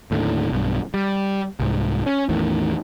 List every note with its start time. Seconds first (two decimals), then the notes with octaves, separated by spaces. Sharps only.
0.11 D#2 A2 D3
0.53 B1 G2
0.94 G3
1.60 C2 G#2
2.06 C#4
2.29 A1 E2 A2 D#3